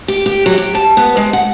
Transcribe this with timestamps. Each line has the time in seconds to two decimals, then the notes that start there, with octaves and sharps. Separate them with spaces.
0.08 G4
0.26 G4
0.46 F#3
0.58 G4
0.75 A5
0.97 B3
1.17 G#3
1.33 F#5